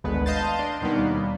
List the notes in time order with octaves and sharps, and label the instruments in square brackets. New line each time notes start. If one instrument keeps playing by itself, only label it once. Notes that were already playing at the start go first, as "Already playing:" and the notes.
[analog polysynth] G#1 D2 G#3 B3 B4
D#5 F5 A5 C6 G6 A6
D4 D#5 C6
D#2 B2 D#3 G3 A#3 B3